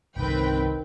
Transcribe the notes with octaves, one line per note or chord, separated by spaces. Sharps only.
G1 C2 D3 D#3 C4 B4 G5